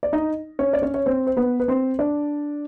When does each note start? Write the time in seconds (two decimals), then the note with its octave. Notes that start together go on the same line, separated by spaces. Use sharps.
0.03 D5
0.13 D#4 D#5
0.59 C#4 C#5
0.73 D5
0.82 C#4 C#5
0.94 C#5
1.06 C4 C5
1.27 C5
1.37 B3 B4
1.60 B4
1.68 C4 C5
1.99 D4 D5